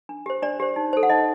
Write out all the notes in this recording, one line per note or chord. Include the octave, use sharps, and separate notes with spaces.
D4
G4 C5
D4 D5
G4 C5
D#4
A4 C5
F#5
D#4 D#5